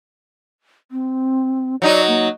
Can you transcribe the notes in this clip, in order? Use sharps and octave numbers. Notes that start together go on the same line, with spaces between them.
C4
F#3 D#4 F#4 D5
A#3